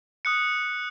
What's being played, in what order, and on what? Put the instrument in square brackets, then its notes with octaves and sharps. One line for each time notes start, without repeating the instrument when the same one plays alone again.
[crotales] D#6 F#6 C#7